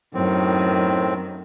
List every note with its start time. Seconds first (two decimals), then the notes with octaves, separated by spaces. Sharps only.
0.14 F#2 A2 D#3 C4